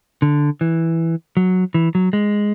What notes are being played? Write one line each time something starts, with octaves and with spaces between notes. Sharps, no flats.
D3
E3
F#3
E3
F#3
G#3